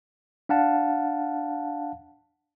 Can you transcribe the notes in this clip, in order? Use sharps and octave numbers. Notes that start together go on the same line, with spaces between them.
D4 F5 F#5 A5